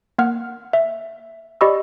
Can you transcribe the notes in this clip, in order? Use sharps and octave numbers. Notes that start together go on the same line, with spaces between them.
A#3 F#5 F6
E5
G4 D5 D#5 B5 C#6 E6